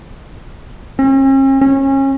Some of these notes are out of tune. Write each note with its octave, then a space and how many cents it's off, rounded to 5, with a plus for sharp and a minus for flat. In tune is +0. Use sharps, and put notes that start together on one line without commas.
C#4 -45
C#4 -30